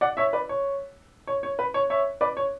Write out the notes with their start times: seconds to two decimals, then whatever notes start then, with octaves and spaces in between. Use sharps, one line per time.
0.01 D5 F#5
0.17 C#5 E5
0.33 B4 D5
0.49 C#5
1.27 C#5
1.43 C#5
1.59 B4
1.74 C#5
1.90 C#5 E5
2.21 B4 D5
2.37 C#5